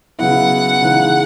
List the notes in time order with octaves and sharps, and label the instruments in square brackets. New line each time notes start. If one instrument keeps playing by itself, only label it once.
[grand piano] C#3 F#3 B3 E4 [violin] F#5
[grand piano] C#3 E3 G#3 D#4